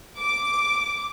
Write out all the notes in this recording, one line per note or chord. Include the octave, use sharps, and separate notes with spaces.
D6